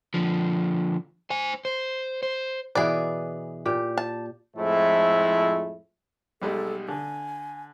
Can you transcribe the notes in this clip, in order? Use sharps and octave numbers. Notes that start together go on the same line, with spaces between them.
D3 F3
C5 G#5
C5
C5
B2 E3 B3 G#4 D5
A#2 G4
A5
F2 A2 F3 G#3 A3 E4
B1 G3 G#3 A4
D3 G#5